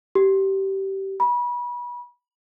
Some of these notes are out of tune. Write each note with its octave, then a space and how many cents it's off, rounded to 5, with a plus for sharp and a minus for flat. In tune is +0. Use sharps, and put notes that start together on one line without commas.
G4 -20
B5 -30